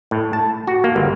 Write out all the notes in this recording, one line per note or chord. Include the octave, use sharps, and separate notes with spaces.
A2
A5
F#4
A#3
G1